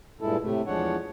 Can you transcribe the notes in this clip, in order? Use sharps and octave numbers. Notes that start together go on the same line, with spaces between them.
G2 A#2 G#3 E4 A4
A2 C3 A3
E2 F3 G#3 D4 C#5 F#5